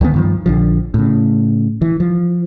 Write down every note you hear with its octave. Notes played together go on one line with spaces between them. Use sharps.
D2 D#3 F#3 B3
G2 D#3 F3
A#1 D3 F3
A2 C#3
E3
F3